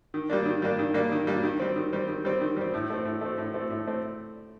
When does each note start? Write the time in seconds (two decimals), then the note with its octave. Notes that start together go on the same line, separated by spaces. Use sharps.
0.14 D#3
0.30 G3 A#3 D4
0.46 D#3
0.62 G3 A#3 D4
0.79 D#3
0.94 G3 A#3 D4
1.12 D#3
1.27 G3 A#3 D4
1.44 D#3
1.60 G3 C4
1.76 D#3
1.93 G3 C4
2.08 D#3
2.25 G3 C4
2.41 D#3
2.57 G3 C4
2.74 A2
2.90 A3 C4
3.05 A2
3.21 A3 C4
3.38 A2
3.54 A3 C4
3.70 A2
3.87 A3 C4